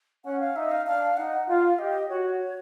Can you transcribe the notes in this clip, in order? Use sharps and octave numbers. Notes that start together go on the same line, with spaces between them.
C#4 F#5
F5
D#4 E5
F5
D4 F5
D#4 F#5
F4 F5
G4 D#5
F#4 C#5